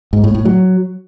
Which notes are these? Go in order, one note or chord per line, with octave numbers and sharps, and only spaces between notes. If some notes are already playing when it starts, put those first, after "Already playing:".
G#2
A2
A2
F#3